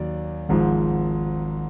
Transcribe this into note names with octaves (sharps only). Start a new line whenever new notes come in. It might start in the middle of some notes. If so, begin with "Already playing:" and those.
Already playing: D#2 F#3 D5
G#1 G#2 F3